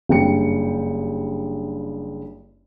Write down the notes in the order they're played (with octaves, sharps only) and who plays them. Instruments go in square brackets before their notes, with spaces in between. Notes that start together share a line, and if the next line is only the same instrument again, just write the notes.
[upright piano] F#1 G2 G5 C#7